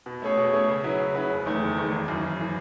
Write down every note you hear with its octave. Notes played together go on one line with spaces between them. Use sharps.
B2
A3 C#4 G#4 C#5
B2
A3 C#4 G#4 C#5
C#3
F#3 C#4 E4 B4
C#3
F#3 C#4 E4 B4
F#1
E2 D#3 A3
F#1
E2 D#3 A3
G#1
F#2 E3
G#1
E3